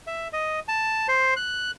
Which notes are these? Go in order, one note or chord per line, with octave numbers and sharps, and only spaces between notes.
E5
D#5
A5
C5
F#6